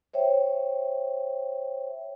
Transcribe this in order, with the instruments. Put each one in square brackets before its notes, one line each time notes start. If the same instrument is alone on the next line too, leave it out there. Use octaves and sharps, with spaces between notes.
[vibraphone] C5 C#5 E5 G5